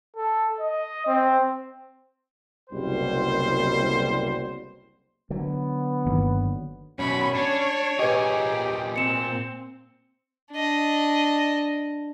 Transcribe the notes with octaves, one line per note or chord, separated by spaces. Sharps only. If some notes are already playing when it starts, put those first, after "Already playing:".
A4
D#5
C4
F#1 C2 B2 G3 C5
D3 F#3 B3
G1 D#3 A#3
F#2 B2 C#4 B5 C#6
D4 C#5
A#2 G4 G#4 B4 D#5
C4 C#7 E7
D4 D#5